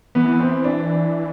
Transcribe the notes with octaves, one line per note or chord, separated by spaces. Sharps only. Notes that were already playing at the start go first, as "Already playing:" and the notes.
E3 B3
C4
D4